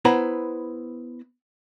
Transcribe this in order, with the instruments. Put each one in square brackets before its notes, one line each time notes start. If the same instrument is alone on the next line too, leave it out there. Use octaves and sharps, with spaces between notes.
[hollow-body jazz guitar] B3 E4 B4 C5 A#5 B5